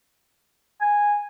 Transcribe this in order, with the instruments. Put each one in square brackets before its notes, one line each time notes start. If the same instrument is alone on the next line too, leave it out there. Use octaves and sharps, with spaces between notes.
[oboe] G#5